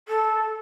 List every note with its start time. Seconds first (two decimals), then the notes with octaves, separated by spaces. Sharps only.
0.08 A4